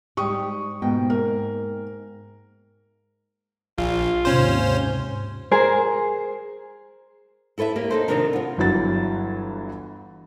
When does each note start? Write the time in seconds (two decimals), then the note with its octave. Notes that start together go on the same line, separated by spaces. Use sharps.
0.17 G#2 G3 G4 C#6 D#6
0.82 G#2 B2 A#3 G5
1.10 A#4
3.78 A#1 F4
4.25 D#2 G#2 C3 C#4 C5
5.51 G#4 A#4 C5
7.58 E4 A4 B4 C#5 E5
7.76 A#3 G4 C#5
7.91 D#4 A4 C5
8.08 C3 D#3 F3 C4 D4 A#4
8.33 B3 F4
8.58 G1 E3 F#3 A6